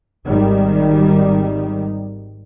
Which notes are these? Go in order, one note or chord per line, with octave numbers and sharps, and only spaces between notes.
G#1 D#3 G3